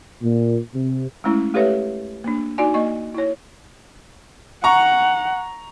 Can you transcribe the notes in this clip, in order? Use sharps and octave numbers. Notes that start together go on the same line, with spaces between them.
A#2
C3
G#3 A3 C#4 E4
A3 G4 A4 B4 C#5 E5
A#3 D4
D#4 F#4 D5 G#5
A#3 D#5 C#6
E4 C#5
F#5 A#5 C#6